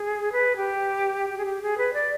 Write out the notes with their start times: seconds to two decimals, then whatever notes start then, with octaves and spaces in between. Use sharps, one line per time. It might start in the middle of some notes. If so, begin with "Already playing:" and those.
Already playing: G#4
0.32 B4
0.56 G4
1.29 G4
1.38 G#4
1.46 G4
1.62 G#4
1.78 B4
1.93 D5